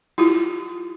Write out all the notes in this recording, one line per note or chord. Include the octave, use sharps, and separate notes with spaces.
E4 F4 G4